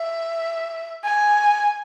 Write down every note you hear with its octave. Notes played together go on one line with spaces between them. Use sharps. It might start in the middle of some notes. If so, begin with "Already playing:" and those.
Already playing: E5
G#5